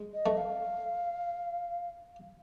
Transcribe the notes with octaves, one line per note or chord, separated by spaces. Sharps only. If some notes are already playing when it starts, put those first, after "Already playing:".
Already playing: G#3
D#5
A3
F5